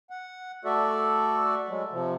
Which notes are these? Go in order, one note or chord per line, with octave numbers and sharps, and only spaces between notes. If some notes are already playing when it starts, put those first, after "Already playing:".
F#5
A3 F#4 A4 D5 E5
F#3 G#3
C3 F3